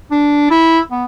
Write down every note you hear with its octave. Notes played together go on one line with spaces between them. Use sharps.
D4
E4
B3